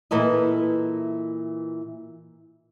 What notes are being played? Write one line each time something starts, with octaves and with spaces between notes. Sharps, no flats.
A#2 E3 E4 A4 B4 D#5